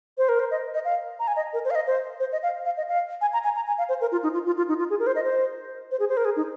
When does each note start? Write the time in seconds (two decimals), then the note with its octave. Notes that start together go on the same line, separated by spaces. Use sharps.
0.18 C5
0.29 A#4
0.40 C5
0.51 D#5
0.74 D#5
0.85 F5
1.20 A#5
1.28 G#5
1.36 D#5
1.53 A#4
1.65 C5
1.71 F5
1.75 D#5
1.87 C5
2.20 C5
2.32 D#5
2.43 F5
2.65 F5
2.77 D#5
2.89 F5
3.21 G#5
3.33 A#5
3.44 G#5
3.56 A#5
3.67 G#5
3.78 F5
3.89 C5
4.01 A#4
4.12 F4
4.23 D#4
4.34 F4
4.46 F4
4.57 F4
4.69 D#4
4.79 F4
4.90 G#4
5.00 A#4
5.07 C5
5.16 D#5
5.24 C5
5.91 C5
6.00 G#4
6.09 C5
6.17 A#4
6.25 G#4
6.36 D#4